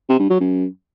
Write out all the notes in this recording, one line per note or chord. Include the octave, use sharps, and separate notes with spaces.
C3
G2
F#3
F#2